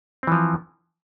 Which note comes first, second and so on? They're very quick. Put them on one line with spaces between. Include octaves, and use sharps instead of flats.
C4 E3 F3